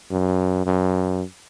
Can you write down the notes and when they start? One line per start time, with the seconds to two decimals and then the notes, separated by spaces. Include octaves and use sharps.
0.11 F#2
0.66 F#2